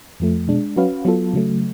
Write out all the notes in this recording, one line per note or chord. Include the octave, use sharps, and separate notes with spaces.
F2 F3 A3
B2 G#3 D4
F#3 C#4 F#4 B4 F5
F#3 B3 F4 A4
C#3 F#3 A3